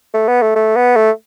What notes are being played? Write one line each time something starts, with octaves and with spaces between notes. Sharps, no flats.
A3
B3
A3
A3
B3
A3